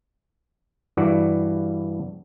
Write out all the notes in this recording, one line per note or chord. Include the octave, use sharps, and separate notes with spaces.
G2 E3 F#4 D5